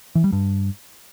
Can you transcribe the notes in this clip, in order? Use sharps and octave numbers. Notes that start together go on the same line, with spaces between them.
E3
G3
G2